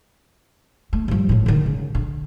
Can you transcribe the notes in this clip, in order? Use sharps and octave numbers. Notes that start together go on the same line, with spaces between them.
A3
G2 F3
G#1 A2
D3 D#3
C#3
D3